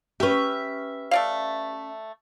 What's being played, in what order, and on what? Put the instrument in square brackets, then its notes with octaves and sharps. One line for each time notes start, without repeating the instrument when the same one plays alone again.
[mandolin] C#4 E5 [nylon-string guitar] G4 B4
[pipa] A3 D5 F5